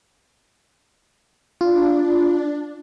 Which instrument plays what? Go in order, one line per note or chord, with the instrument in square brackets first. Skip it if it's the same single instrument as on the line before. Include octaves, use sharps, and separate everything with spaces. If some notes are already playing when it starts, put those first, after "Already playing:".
[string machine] D4 [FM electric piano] F4